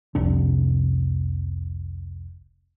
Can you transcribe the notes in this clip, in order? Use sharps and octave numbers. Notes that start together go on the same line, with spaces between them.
F1 C2 C3 D4